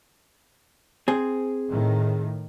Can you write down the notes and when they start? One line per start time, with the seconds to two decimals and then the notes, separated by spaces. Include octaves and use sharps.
1.08 C4 G#4
1.70 A2 D#3